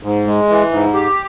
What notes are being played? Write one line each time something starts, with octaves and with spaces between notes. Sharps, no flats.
G#2
G#3
E3
G#2
G4